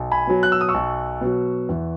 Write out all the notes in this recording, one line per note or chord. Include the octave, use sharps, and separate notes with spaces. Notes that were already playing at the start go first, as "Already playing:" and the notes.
Already playing: B1
G#5 B5
B2 F#3
F#6
E6
D#6
C#6 E6
B1
B2 F#3
E2